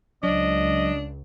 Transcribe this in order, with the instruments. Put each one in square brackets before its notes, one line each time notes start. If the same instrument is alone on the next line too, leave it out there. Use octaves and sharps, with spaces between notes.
[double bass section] C#2 [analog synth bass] F#3 [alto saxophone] D4 [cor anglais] D#5